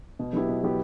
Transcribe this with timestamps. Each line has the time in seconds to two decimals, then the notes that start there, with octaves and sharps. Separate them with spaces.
0.19 B2
0.33 F#3 B3 E4 G4
0.49 B2
0.63 F#3 B3 E4 G4